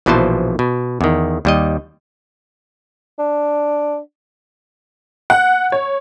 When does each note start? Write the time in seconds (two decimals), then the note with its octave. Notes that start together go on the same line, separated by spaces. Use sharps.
0.06 A#1 B2 E3 F3 C5 A5
0.59 B2
1.01 E2 D#3
1.45 D#2 G3 D#5
3.19 D4
5.30 F#5
5.72 C#5